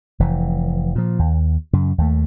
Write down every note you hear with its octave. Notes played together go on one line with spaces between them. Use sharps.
F1 E3
A#2 F3
D#2
F#2 C#3
D#2 A3